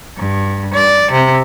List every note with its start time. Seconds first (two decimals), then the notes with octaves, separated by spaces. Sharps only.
0.17 G2
0.74 D5
1.12 C3